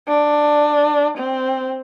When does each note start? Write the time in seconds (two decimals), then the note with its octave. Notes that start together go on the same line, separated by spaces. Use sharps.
0.08 D4
1.18 C4